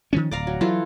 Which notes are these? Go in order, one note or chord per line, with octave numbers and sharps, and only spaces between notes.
D#3 F3 C#4
D1 D5 F5 A#5
F#3
E3 F#3 F4 A4